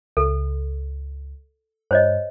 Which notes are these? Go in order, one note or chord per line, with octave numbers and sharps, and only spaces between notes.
C#2 A4
G2 C5 C#5 D#5